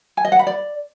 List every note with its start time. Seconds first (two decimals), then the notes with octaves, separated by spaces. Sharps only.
0.17 G#5
0.25 D#5
0.32 F#5
0.39 B5
0.47 D5